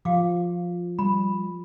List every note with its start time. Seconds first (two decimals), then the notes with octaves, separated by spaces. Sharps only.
0.05 F3 G4 F5 D6
0.99 G3 B5